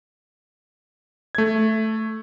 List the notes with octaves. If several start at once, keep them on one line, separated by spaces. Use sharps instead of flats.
A3 G#6